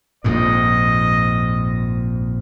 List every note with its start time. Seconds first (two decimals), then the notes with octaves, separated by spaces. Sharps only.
0.24 A#1 F2 G#2 D#5